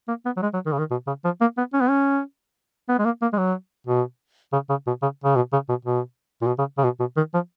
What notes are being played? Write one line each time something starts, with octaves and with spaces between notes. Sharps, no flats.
A#3
B3
F#3
G#3
F#3
D#3
C#3
D#3
B2
C#3
F3
A#3
B3
C#4
B3
C#4
B3
G#3
A#3
A#3
G#3
F#3
B2
C#3
C#3
B2
C#3
C#3
B2
C#3
B2
B2
A#2
B2
C#3
C#3
B2
B2
D#3
F3